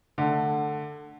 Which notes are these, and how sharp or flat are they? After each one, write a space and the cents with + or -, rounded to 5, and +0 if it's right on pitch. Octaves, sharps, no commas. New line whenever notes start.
D3 +15 A3 +0